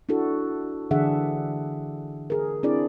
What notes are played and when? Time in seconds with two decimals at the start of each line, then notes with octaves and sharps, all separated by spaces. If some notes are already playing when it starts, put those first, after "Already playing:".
0.09 D4 E4 F#4 A4
0.91 D3 E3 D4 G#4 E5 F#5
2.30 G#4 A#4
2.63 C4 D4 E4 G#4 D5